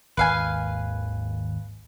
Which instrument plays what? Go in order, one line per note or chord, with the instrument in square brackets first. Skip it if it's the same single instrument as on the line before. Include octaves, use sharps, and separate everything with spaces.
[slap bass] G#1 D#2 [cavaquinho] B4 F5 G#5